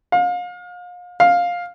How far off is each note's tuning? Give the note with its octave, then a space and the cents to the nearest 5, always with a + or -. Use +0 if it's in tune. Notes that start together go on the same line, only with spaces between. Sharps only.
F5 +35
F5 +10